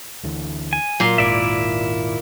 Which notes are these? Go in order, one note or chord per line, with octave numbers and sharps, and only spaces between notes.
D2 D3 E3
G#5
A#2 F#3 C6
G#1 D#2 G#2 E4 D5 E5